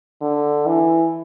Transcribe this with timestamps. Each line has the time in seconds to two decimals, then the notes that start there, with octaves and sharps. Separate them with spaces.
0.21 D3
0.66 E3